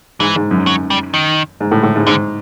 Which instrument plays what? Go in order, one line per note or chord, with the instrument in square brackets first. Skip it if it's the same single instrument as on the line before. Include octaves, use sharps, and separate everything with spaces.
[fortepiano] G#2 [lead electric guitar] E3
[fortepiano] G#2
F#2
[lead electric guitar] F#3
G3
D#3
[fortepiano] G#2
A2
A2
G#2
[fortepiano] G#2 [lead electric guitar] D3